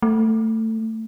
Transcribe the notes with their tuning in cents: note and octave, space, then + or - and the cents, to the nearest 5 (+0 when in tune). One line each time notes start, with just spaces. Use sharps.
A3 +20